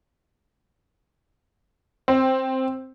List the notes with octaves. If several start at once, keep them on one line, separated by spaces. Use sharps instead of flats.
C4